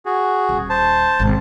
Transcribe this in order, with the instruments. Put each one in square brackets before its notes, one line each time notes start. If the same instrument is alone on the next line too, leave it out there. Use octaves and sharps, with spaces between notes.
[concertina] F#4 G#4
[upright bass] D#1
[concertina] C5 A5
[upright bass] G#1 B2